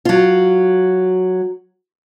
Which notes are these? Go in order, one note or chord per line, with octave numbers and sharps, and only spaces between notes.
F#3 F4